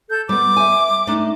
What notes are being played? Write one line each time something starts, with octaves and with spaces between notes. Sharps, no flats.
A4 G6
G3 B3 D6
E5 G#5
A3 D4 D#4